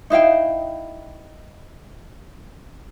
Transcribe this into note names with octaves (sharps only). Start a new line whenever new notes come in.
D#4 E4 F5 G5